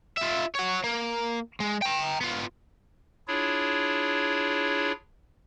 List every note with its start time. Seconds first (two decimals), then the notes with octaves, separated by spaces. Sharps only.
0.18 F4 E5
0.55 C#5 F#5
0.84 A#3
1.60 G#3
1.82 G5 A#5
2.21 B3 F4
3.28 D4 E4 F4 G#4 C#5